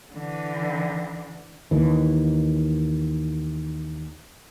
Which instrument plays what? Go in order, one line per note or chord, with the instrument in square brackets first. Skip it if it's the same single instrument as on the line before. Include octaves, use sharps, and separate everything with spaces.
[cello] D3 E3
[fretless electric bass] D#2 E3